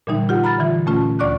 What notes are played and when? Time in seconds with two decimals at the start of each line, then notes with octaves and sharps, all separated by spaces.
0.07 A#2 D3 E3 G3 D#4
0.29 F4 G4 F#5
0.44 A#5 B5 F6 A6
0.59 D3 E3 F4
0.86 A#2 A3 C#4 F4
1.19 D2 D5 C#6 D6 F#6